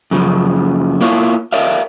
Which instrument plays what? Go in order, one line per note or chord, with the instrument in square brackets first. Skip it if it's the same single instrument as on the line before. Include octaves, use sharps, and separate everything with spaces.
[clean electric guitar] F#2 C#3 F3
A#3 E4 F4 C#5
A#4 C#5 D5 E5 F5